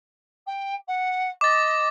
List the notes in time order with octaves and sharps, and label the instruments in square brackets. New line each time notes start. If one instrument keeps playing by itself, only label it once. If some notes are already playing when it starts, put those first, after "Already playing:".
[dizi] G5
F#5
[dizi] D#5 [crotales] D6 A6